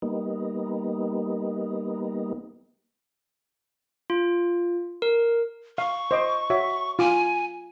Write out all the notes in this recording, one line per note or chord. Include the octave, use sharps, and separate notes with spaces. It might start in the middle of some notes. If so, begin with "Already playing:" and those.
G3 A#3 B3 D#4
F4
A#4
F5 C#6
C5 D#5 D6
F#4 C#5 E5
F4 G#5 D6